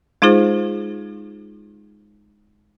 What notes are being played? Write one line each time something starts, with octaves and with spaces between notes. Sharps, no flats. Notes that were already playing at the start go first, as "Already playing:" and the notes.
G#3 D#4 F4 G#4 C5